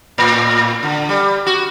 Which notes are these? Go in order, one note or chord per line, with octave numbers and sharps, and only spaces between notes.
A2
D3
G3
F#4